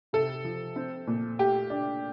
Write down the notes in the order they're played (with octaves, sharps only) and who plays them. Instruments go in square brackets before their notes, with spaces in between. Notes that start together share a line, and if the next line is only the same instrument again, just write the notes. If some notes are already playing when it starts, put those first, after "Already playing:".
[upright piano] C3 [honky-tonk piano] A4
[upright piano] F3
C4
A#2
[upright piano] A3 [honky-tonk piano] G4
[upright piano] D4